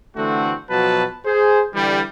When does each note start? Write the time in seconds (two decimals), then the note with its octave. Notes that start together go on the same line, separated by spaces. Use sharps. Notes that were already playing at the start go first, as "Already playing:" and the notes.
0.16 D3 E3 A3 C4 F#4
0.70 B2 F3 F#3 B4 A5
1.26 G#4 C5
1.75 D3 E3 G3